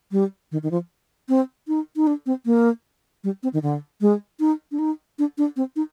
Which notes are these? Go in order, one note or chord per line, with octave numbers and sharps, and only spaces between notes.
G3
D#3
D#3
F3
C4
D#4
D#4
D4
C4
A#3
G3
C4
D#3
D3
G#3
D#4
D4
D#4
D4
D4
C4
D#4